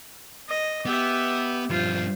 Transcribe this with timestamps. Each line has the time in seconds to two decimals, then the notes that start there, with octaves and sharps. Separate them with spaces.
0.49 D#5
0.85 B3 G4 E5
1.70 G2 F3 F4 C5